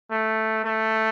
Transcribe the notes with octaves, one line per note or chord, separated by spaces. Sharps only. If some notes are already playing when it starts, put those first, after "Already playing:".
A3
A3